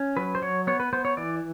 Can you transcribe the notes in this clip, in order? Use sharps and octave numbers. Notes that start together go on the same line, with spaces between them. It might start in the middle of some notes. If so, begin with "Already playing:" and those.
Already playing: C#4
F#3 B4
C5
F#3 C#5
B3 C#5
B4
B3 C5
C#5
E3 D5